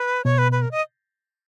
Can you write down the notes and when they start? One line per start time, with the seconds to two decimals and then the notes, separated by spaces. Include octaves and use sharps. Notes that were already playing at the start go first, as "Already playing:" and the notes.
Already playing: B4
0.25 B2 C#5
0.38 B4
0.52 B4
0.62 A#4
0.71 D#5